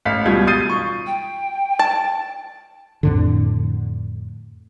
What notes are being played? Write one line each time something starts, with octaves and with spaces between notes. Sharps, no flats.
A1 F5 B6
C#2 B2 G3 F4 G#6
D#6 G6 A6 C7 D#7
C#6
G5
A5
F2 A2 D3